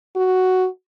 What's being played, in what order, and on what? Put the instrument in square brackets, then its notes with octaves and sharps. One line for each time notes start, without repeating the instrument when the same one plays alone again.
[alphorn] F#4